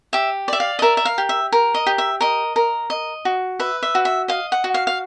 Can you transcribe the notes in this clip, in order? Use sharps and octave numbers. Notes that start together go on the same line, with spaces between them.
G4 E5
D5 E5
F5
D#5
A#4 E5
E5
F5
G4
E5
A#4
D#5
G4
E5
A#4 D#5
A#4
D#5
F#4
B4 E5
E5
F#4
E5
D#5 F5
F#5
F#4
F5
F5